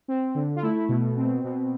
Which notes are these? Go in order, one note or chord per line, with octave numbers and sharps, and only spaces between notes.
C4
D3
F4
A3 E4
B2
C4
B2